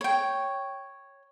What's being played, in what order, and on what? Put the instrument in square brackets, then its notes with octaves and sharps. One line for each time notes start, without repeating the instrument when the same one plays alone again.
[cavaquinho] C#5 G5